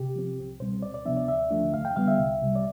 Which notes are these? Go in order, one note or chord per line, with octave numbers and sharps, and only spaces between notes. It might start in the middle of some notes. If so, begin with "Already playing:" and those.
Already playing: C3 G4
F3 C4
C2
B2 G3 C4 C5
D2 D5
D5
C3 F3 B3 D4 E5
D5
D2 E5
D3 F3 A3 D4
E2 F5
G5
D3 G3 B3 F5
E5
C2
C3 G3
D5